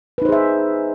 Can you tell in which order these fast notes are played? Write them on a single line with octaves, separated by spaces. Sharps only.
B4 D#4 C5 G#4 E5